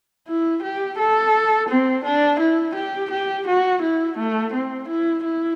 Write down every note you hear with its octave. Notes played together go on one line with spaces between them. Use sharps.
E4
G4
A4
C4
D4
E4
G4
G4
F#4
E4
A3
C4
E4
E4